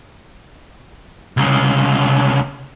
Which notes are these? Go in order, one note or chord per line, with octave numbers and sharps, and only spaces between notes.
C2 C#3